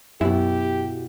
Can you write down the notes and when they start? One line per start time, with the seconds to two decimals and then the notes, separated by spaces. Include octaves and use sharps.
0.21 F#2 B2 E4 G4